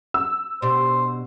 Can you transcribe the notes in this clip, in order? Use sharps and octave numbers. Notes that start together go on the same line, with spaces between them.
E6
B2 D4 G4 C5